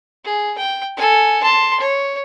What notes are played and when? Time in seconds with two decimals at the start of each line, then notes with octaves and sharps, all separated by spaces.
0.25 G#4
0.58 G5
0.97 A4 G#5
1.43 A5 C6
1.80 C#5